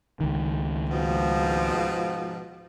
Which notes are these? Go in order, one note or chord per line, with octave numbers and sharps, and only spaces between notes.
C#2 D#3
G#2 B2 F3